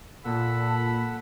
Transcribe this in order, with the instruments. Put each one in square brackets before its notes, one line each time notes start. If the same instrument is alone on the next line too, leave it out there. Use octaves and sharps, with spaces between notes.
[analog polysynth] A#2 [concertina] A4 F#5 E6 [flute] A5 [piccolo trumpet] B5